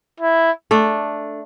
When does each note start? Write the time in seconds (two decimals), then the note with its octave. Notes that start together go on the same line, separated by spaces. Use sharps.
0.20 E4
0.71 A3 D4